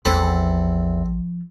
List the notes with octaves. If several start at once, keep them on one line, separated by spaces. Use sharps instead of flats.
A1 E2 F3 C4 A4 B5